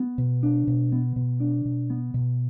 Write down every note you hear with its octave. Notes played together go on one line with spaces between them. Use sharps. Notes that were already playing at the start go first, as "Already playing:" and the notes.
Already playing: B3
B2
D4
B2
B3
B2
D4
B2
B3
B2